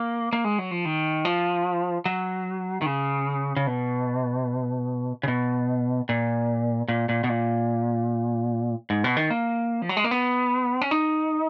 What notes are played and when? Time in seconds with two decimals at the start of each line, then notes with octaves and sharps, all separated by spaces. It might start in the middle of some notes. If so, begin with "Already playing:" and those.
Already playing: A#3
0.33 A#3
0.45 G#3
0.58 F#3
0.71 F3
0.85 D#3
1.25 F3
2.06 F#3
2.82 D#3
2.86 C#3
3.56 C#3
3.67 B2
5.23 C#3
5.28 B2
6.09 A#2
6.88 A#2
7.09 A#2
7.24 B2
7.29 A#2
8.90 G#2
9.04 B2
9.17 D#3
9.31 A#3
9.82 F3
9.89 F#3
9.97 G#3
10.04 A#3
10.11 B3
10.81 C#4
10.91 D#4